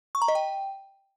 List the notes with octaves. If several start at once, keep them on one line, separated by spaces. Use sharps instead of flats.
C#6
A#5
D#5
G5